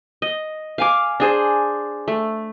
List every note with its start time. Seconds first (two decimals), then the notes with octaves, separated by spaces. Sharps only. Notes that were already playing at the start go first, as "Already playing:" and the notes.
0.22 D#5
0.78 F5 G#5 D6
1.20 D4 G#4 C5
2.08 A3